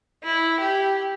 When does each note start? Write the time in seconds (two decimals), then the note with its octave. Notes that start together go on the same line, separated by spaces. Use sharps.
0.24 E4
0.60 G4